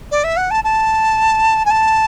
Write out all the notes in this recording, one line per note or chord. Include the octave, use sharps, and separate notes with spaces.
D5
E5
F#5
A5
A5
G#5
A5